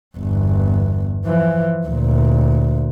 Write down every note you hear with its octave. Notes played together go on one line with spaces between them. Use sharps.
G1 E2
E3 F3
D2 A#2